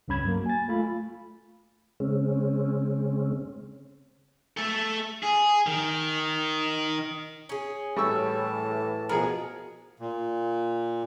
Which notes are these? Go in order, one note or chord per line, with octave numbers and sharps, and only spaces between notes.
C#2 G2 C#4 B5 G#6
F#3 A#3
G#5 A6
A3 F4 B5
C#3 G#3 C4 C#4
A3 A4
G#4
D#3
C#4 G#4
A2 E3 G3 A5 C#6 E6
B2 F3 B3 E4 G#4 A#4
A#2